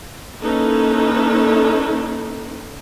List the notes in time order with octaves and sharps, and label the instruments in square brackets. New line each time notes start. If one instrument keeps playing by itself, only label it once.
[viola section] A#3 C#4 D#4 E4 A4 B4